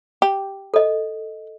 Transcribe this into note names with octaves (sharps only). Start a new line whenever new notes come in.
G4
A4 D#5